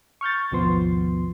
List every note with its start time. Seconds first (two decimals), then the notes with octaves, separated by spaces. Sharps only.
0.21 C#6 F6 G6 A6
0.51 G#1 D#2 B2 F3 B3 C6